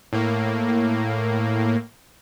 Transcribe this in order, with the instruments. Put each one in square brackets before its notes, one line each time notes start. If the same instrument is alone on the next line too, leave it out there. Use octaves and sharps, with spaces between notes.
[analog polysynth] A2 A#3